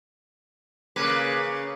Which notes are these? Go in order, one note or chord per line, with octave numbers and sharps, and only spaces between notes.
C#3 A#3 B4